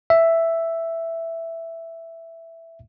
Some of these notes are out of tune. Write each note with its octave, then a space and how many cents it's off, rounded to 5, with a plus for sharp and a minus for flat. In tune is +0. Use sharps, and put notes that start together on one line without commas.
E5 +5